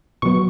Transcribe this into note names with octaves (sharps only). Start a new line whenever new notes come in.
B2 F#3 B3 C#6